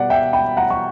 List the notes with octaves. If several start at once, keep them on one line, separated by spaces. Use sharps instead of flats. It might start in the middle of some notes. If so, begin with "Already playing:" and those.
Already playing: B2 G3 B3 D5 F#5
E5 G5
G5 B5
F#5 A#5
C#6